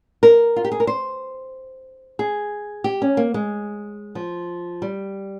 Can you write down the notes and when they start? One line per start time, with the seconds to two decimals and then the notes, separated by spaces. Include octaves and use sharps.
0.23 A#4
0.56 F4
0.64 G4
0.72 G#4
0.80 A#4
0.87 C5
2.19 G#4
2.84 G4
3.02 C#4
3.17 A#3
3.34 G#3
4.15 F3
4.82 G3